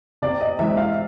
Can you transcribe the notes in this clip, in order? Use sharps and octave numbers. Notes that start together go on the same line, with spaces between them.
C3 D5
D#5
E3 G#3 C4 E5
F5